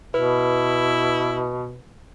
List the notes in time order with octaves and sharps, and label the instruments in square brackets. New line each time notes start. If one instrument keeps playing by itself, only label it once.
[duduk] B2 [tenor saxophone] E4 [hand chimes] B4